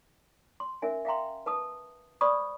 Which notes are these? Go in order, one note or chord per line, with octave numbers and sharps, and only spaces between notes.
C6
C#4 A#4 E5 G#5
E5 F5 G5 A#5 C6
B4 A5 D#6
C5 D5 B5 C#6 D#6 E6